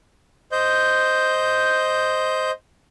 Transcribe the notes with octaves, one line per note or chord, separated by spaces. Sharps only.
C5 D#5 G6